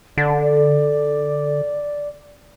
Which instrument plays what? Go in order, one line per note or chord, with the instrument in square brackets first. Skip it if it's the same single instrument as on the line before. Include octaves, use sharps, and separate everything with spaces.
[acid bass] D3 [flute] D5